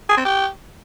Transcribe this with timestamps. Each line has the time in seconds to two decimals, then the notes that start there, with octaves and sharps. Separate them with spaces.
0.09 G#4
0.17 C4
0.25 G4